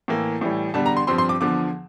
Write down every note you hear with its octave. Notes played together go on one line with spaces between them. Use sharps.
A2 E3 A#3
A2 E3 G3
E2 D3 G3 A5
A#5
C6
G2 F3 C4 C6
C6
D6
E2 D3 F3 D6